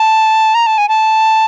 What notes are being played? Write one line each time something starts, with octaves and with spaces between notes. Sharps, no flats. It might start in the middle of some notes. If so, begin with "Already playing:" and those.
Already playing: A5
A#5
A5
G#5
A5